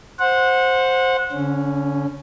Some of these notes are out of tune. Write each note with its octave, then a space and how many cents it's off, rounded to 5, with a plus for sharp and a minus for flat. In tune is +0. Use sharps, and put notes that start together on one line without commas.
C5 +5 F#5 -20
D3 -35 C#4 +0